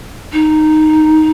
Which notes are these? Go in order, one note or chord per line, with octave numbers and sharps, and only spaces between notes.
D#4